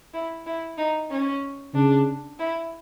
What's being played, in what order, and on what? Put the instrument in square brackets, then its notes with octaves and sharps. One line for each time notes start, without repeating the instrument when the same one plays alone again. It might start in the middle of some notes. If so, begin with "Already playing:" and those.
[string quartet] E4
E4
D#4
C#4
[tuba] C#3 [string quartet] D4
[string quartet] E4